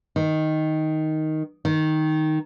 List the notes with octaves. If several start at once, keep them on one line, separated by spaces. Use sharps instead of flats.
D#3
D#3